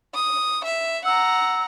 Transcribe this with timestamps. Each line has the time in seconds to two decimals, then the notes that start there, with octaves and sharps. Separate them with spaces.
0.15 D#6
0.65 E5
1.05 F#5 A#5 E6